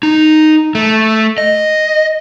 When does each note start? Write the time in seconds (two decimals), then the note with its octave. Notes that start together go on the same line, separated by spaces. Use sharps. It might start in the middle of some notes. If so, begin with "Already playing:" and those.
0.03 D#4
0.75 A3
1.38 D#5